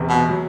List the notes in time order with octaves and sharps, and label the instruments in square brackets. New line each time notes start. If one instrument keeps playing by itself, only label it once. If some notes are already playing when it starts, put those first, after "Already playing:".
Already playing: [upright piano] E1 E2 C3
[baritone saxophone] B2
[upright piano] F#3